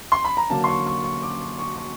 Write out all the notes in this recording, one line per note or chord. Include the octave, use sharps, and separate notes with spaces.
C6
B5
A#5
D3 F#3 A#3 A5
C6
C#6
C#6
C#6
D6
C#6
C#6
C#6